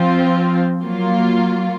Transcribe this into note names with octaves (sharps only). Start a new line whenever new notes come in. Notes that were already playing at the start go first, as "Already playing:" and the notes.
Already playing: F3 C4 F4
F#3 A#3 F4